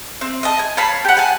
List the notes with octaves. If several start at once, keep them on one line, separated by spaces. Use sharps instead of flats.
C4
D#5 A5
G#5
C#5 F5 A5 B5
G4 F#5
G#5 A5